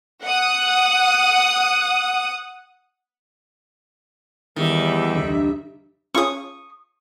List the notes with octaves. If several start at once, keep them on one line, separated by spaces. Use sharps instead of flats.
F#5 D#6
E2 D#3 G3 E5
F1 D2
C#4 F4 G#4 C#6 D#6